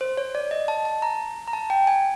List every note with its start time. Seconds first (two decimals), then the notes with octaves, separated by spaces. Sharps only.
0.01 C5
0.17 C#5
0.35 D5
0.51 D#5
0.68 A5
0.85 A5
1.02 A#5
1.48 A#5
1.53 A5
1.70 G5
1.87 G#5